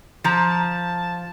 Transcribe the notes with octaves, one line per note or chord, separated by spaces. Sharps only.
F3 A5 A#5